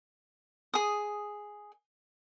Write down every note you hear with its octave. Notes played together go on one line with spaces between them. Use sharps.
G#4 D#6